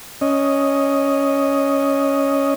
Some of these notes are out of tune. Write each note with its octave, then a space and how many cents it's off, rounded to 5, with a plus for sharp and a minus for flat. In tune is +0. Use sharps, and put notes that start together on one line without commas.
C#4 +0 D#5 +0